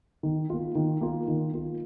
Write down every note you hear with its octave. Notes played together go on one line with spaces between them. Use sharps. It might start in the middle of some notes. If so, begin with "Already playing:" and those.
D#3
A#3 F4
D#3
A#3 F4
D#3
A#3 F4